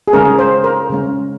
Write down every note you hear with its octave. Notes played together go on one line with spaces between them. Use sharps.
G#4
C#3 G#3 C#4 A#4
C5
A#4
C#3 G#3 C#4